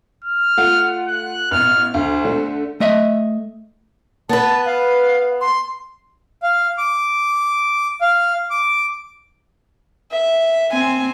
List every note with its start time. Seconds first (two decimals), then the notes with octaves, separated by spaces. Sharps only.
0.24 F6
0.57 A3 F4 F#5
1.08 F#6
1.51 A1 B2 F6
1.94 D2 C5
2.25 D3 A3
2.80 A3 D#5 E5
4.29 B3 B4 A5
4.65 F5
5.41 C6
6.43 F5
6.78 D6
8.01 F5
8.50 D6
10.12 E5
10.72 C4 G#5